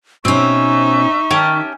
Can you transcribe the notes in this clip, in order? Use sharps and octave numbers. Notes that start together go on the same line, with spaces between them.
B2 C4 C#4 D#4 E5 C#6
D#3 C#4 G4 A5